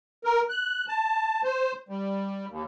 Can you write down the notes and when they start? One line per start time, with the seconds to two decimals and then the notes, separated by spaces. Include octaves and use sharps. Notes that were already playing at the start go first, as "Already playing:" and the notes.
0.24 A#4
0.49 F#6
0.88 A5
1.44 C5
1.89 G3
2.49 D#2